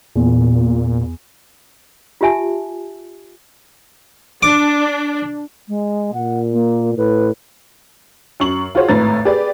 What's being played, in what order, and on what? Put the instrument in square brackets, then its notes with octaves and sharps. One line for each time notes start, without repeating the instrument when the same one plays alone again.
[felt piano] E2 [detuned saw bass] A#2
[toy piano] F4 G4 E5 G#5 A5
[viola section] D4 [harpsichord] D6
[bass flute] G#3
[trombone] A#2 [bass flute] F#5
[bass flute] A#3
[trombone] A2 [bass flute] B4
[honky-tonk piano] F#2 C#6 F#7
F4 F#4 G#4 C5 C#5
G#1 A2 B4 A#5 A6
G4 G#4 B4 D5